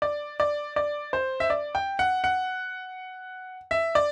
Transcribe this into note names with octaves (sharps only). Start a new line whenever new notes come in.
D5
D5
D5
C5
E5
D5
G5
F#5
F#5
E5
D5